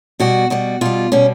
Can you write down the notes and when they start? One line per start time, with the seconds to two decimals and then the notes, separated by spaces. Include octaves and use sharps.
0.20 B2 G3 F#4
0.50 B2 G3 F#4
0.81 B2 G3 F4
1.12 B2 G3 C#4